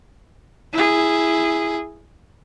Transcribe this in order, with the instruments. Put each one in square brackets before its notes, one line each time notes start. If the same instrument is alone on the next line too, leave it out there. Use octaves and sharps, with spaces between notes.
[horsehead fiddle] E4 G#4